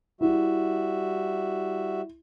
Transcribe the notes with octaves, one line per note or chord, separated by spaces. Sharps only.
G3 E4 F#4 E5